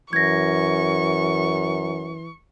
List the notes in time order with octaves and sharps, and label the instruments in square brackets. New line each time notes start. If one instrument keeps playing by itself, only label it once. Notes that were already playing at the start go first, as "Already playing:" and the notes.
[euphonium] F#2 [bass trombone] E3 [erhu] C#6 [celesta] G#6 A#6